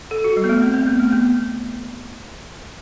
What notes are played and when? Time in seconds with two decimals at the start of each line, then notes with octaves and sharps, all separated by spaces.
0.11 A4
0.24 F#4
0.37 G3
0.44 B3
0.49 A3
0.62 C4
0.74 C4
0.87 B3
1.00 A3
1.12 B3